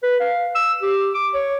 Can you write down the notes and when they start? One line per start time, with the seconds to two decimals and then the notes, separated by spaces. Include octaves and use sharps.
0.03 B4
0.20 F5
0.55 E6
0.82 G4
1.14 D6
1.34 C#5